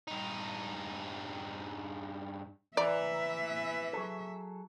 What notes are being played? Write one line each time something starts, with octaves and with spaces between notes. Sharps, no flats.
G2 D#4
E3 D5 E5 A#5
F#3 G#4 A4